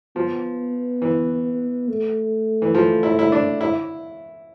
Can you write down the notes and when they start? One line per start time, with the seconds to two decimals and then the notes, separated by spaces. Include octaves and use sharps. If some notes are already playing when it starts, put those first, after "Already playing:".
0.16 F3 B3
1.02 E3
1.88 A3
2.62 E3
2.75 F3
3.03 E4
3.19 E4
3.32 D4
3.61 E4